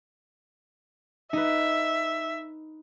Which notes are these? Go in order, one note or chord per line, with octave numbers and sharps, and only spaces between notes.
D#4 B4 E5